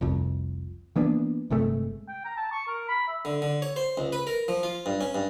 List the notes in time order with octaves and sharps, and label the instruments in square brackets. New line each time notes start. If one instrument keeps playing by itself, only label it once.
[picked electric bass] F1 C2 F2
E3 A#3 B3 D4
G1 C3 G#3 A3
[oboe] G5
A#5
A5
C#6
A#4
B5
E5
[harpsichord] D3
D3
C#5
C5
C#2
B4
A#4
F3
F4
G2
C#4
G2